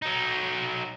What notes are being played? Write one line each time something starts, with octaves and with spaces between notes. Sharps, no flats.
F#3 D#4